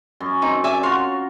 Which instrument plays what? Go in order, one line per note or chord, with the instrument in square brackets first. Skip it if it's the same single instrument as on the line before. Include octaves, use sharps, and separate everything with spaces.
[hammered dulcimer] F#2
[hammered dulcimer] C4 [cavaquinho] D#4
[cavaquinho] D5 E5 G#5
[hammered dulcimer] F4 F#4 [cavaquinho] C#5 C6